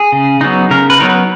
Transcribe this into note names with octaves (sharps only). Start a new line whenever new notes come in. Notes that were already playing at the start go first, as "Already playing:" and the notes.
Already playing: G#4
C#3
F#3 B3 D#4
C#3 A#4
B4
F#3 B3 D#4 A#4
B4